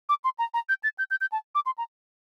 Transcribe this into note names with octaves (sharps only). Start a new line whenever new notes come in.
D6
C6
A#5
A#5
G6
A6
G6
G6
G6
A5
D6
C6
A#5